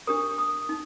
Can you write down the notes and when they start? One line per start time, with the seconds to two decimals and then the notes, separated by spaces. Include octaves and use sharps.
0.07 D4 G4 A#4 D#6
0.38 D#6
0.69 D#4